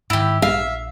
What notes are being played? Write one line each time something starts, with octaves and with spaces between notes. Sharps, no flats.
G#2 D#3 E4 G4
A#1 E5 F5